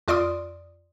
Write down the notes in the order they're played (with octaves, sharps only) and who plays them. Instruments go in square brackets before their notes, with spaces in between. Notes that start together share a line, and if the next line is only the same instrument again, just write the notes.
[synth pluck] F2 F4 D5 C6 D#6